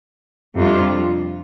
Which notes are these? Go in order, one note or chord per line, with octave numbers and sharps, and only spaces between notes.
F2 C3 G3 D4 F4